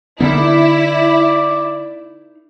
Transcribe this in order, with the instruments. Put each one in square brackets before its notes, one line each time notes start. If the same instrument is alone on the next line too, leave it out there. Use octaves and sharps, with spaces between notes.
[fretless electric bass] D3 B3 [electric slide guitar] D#4 G#4 A#4 [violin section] E4 [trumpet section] D5